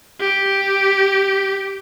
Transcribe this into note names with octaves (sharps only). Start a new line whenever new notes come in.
G4